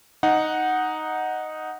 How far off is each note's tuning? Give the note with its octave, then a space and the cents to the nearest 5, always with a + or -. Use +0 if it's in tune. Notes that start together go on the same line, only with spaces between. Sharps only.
D#4 +0 F#5 +0